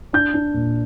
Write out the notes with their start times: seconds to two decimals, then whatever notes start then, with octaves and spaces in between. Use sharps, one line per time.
0.13 D4 G6
0.34 D4
0.54 A#2